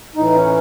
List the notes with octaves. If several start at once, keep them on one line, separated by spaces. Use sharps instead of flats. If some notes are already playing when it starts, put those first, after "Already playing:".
A2 E3 D#4
C#4